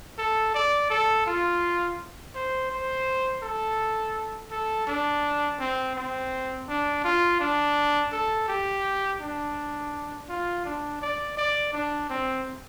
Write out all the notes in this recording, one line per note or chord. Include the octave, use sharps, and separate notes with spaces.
A4
D5
A4
F4
C5
C5
A4
A4
D4
C4
C4
D4
F4
D4
A4
G4
D4
F4
D4
D5
D5
D4
C4